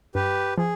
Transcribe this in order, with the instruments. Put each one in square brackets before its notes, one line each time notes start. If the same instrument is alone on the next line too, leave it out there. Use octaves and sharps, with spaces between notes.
[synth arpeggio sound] G2 [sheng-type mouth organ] G4 B4
[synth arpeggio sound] F3 [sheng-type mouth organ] G#4